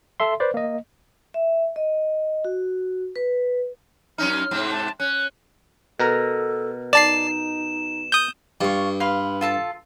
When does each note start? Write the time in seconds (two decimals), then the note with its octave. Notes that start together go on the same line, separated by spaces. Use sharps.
0.20 A4 E5 C6
0.40 B4 C5 D5
0.54 A#3 D#5
1.34 E5
1.76 D#5
2.45 F#4
3.16 B4
4.18 F#2 C#4 D#4 F6
4.51 G#2 C3 C4
4.71 A5
5.00 C#4 F#6
6.00 B2 A4 A#4 A#5
6.93 D#4 D5 A5 C7 E7
8.12 D#6 G6
8.61 G2 F4 C#6
9.00 B4 F5 C6
9.41 F4 A4 A5